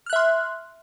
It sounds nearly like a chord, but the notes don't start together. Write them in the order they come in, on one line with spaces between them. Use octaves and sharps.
F6 F#6 E5 C6